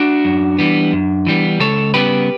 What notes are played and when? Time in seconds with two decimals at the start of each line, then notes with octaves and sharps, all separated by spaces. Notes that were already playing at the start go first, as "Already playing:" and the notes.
Already playing: D4 F#4
0.25 F#2
0.59 E3 G3 B3
0.93 F#2
1.27 E3 G3 B3
1.60 C#2 A4 C#5
1.94 C#3 G3 B3 G4 B4